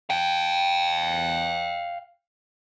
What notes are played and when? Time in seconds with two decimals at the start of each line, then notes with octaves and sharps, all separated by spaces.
0.10 F5 G5